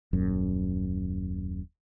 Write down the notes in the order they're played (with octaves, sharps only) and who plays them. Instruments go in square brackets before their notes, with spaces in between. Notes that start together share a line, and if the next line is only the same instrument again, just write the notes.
[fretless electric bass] D#1 F#2